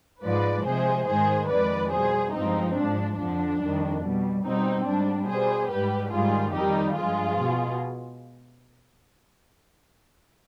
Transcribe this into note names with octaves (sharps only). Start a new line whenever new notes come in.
G#2 F3 G#3 B4 D5
C3 F3 G#3 G#4 C5
G#2 D#3 G#3 G#4 C5
F2 D#3 G#3 B4 D5
B2 G3 G#4 C5
G2 F3 G#3 C4 D#4
G#2 F3 G#3 D4
F2 D3 F3 D4
F2 D#3 G3
B2 G3
B2 G3 C4 D#4
G#2 G3 D4
B2 G3 G#4 C5
G#2 G3 G4 B4
G#2 D#3 G3 F4 G#4
F2 D#3 G3 D#4 G4
G2 F3 G#3 F4 G#4
B2